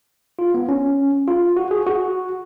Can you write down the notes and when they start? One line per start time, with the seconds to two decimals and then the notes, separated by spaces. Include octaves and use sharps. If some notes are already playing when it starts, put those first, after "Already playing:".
0.39 F4
0.54 B3
0.69 C#4
1.28 F4
1.57 F#4
1.71 G#4
1.87 F#4